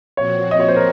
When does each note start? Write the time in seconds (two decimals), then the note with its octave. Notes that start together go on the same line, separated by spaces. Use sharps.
0.17 A#2 F3 C4 F#4 C#5
0.51 D#5
0.60 C#5
0.68 C5
0.76 A#4